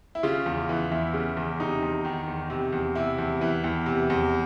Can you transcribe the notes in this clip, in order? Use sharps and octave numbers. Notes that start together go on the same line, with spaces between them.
E4
C#3 F4
E2
E3
E2 E4
C#3
E2
C3 D#4
E2
D#3
E2
C3
E2
C3 E4
E2
E3
E2
C3
E2